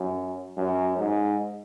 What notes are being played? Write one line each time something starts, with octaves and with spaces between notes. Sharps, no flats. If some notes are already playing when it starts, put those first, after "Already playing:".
Already playing: F#2
F#2
G#2